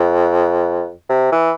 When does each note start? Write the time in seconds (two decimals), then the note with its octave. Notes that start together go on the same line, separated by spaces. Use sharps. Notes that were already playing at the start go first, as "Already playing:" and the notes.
Already playing: F2
1.10 C3
1.32 E3